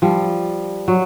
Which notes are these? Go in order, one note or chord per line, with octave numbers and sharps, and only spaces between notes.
F3 G3
F#3